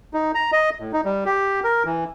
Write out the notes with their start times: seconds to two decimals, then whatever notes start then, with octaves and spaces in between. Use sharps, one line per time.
0.14 D#4
0.35 A#5
0.52 D#5
0.80 A2
0.93 D#4
1.05 G3
1.26 G4
1.64 A#4
1.85 E3